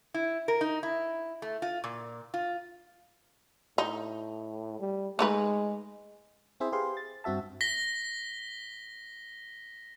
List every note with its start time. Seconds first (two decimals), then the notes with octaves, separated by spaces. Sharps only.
0.14 E4
0.48 A#4
0.61 D#4
0.83 E4
1.42 A3
1.62 F4
1.84 A#2
2.34 F4
3.78 A2 D#4
4.80 G3
5.19 G#3 A3 D#4 B4
6.60 C4 E4 G#4 C5 E5
6.72 G4 G#4 B4 C5 F5 C6
6.97 A6
7.24 G2 C4 F#4 E5 A5
7.61 A#6 B6 G7